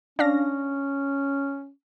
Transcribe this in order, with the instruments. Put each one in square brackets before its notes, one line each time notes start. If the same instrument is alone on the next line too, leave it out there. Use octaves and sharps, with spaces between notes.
[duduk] C#4 [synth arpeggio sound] D4 F5 A#6